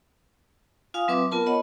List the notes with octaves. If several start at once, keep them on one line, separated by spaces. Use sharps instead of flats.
F4 F5 G#5 D#6
F#3 C4 B4 E5 D6
B3 F4 A#4 A5
C#5 D#5 F#5 B5